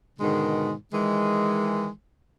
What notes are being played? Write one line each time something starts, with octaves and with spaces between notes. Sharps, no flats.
G#2 B2 D3 D#3 G#3
D#3 E3 G#3